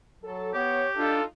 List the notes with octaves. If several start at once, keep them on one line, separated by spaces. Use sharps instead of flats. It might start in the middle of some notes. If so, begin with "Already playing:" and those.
F#3 A4
B3 G4 C#5
D4 D#4 F4 A4